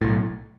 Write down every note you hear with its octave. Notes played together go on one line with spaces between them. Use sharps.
B1 A2